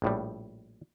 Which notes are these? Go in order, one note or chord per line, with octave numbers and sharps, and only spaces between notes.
A#1 A2 G3